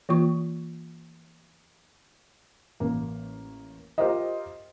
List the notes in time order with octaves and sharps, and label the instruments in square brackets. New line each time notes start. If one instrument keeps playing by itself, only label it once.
[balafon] E3 A#3 F4 C#6
[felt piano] A1 A#3
F4 G4 A#4 C5 D#5